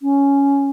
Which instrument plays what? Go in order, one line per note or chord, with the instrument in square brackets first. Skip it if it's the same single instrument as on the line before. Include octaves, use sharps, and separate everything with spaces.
[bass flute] C#4